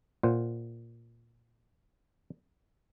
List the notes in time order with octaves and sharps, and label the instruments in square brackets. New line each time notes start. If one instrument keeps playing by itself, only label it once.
[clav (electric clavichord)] A#2 C5 F#5